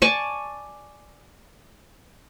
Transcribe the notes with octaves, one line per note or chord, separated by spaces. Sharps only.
D5 G#5 A5 C#6